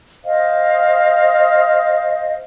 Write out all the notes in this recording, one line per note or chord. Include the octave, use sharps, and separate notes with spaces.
C5 D#5 F5